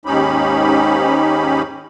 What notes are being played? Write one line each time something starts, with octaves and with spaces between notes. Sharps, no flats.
D#2 G#2 C#4 D#4 G4 B5